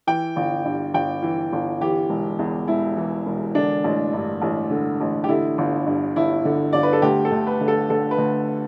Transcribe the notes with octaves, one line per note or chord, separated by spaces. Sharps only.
E3 G5
G1
G2
G1 G5
E3
G1
E3 G4
E1
E2
E1 E4
E3
E1
D3 D4
A1
G2
A1
D3
A1
G4
D3 E4
G1
G2
G1 E4
D3
G1 D5
B4
A4
D2 G4
A4
D2
B4
D3
A4
D3 A4
B4
D2